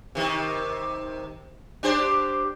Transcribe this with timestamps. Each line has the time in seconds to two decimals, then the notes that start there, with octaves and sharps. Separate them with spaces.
0.15 C3 D#3
1.83 D4 G4 C5